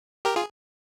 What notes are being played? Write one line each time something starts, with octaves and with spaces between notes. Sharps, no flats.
G4 A#4
F4 G#4